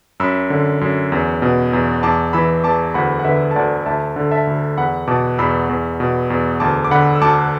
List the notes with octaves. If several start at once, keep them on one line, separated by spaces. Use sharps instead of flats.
F#2 B5 E6
D3
F#2
E2
B2
E2
E2 A5 D6
E3 B5 E6
E2 A5 D6
D2 F#5 B5
F#5
D3 B4 E5
A5
D2 D5 F#5
D2 E5 A5
D3
E5 A5
D2
E2 F#5 B5
B2 A5 D6
E2 B5 E6
E2
B2
E2
D2 A5 D6
D6
D3 F#5 B5
E6
D2 A5 D6